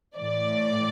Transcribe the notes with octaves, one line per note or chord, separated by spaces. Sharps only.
A2 E3 D5